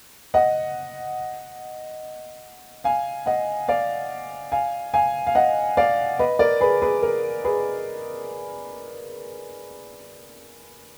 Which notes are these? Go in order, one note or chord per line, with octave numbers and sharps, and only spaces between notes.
D#5 F#5
F5 G#5
D#5 F#5
D5 F5
F5 G#5
F5 G#5
F5
D#5 F#5
D5 F5
B4 D#5
A#4 D5
G#4 B4
G#4 B4
A#4
G#4 B4